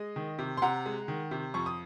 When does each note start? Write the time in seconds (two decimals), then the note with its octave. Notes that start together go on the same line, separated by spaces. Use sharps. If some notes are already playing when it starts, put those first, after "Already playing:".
Already playing: G#3 D#5
0.16 D#3
0.39 C3
0.57 C6
0.62 C3 F#5 A#5
0.86 G#3
1.08 D#3
1.31 C3
1.54 F2 C#6
1.66 D#6